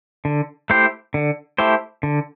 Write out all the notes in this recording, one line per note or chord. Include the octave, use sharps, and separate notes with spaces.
D3
A3 E4 G4 C5
D3
A3 E4 G4 C5
D3